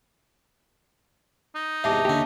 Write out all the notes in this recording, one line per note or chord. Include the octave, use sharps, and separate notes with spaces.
D#4
E2 G#2 C3 E5 A5 D6
D#2 D3 C#4 G4